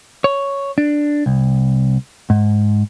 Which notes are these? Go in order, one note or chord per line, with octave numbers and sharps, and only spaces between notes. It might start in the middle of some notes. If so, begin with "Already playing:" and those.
C#5
D4
C2
G#2